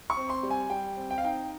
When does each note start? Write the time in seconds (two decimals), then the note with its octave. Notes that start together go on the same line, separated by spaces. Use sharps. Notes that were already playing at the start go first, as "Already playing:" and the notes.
0.10 C#6
0.17 C4
0.30 C6
0.43 G3
0.50 G#5
0.70 G3 G5
0.97 C4
1.11 G5
1.18 F5
1.24 D#4 G5